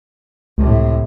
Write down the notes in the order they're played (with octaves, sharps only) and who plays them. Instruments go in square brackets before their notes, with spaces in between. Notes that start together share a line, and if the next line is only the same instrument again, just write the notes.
[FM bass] C#2 [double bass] A2 C3